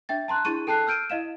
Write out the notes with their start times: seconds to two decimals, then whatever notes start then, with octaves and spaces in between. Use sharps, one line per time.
0.09 D4 E5 G5 A6
0.28 A5 A#5 C6 F#6
0.45 D4 E4 G#4 C#6 D#7
0.67 A4 G5 A5 F#6 C7
0.87 E6 F6 G6 D7 D#7
1.10 E4 D#5 F5 E7